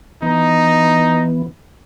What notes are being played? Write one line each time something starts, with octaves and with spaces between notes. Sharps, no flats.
E3 B3 D#4